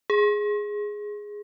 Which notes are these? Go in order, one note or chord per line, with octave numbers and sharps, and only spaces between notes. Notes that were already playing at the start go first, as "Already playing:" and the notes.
G#4